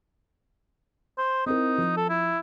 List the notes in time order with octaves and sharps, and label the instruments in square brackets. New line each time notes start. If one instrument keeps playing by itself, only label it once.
[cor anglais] C5
[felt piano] C4 E4 A#4 [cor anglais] D#4
[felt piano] F3
[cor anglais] A4
E4